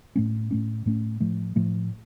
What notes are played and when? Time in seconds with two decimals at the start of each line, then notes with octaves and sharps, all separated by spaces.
0.16 A2 A3 C#4
0.51 A2 A3 C#4
0.86 A2 A3 C#4
1.20 A2 F3 A3
1.56 A2 F3 A3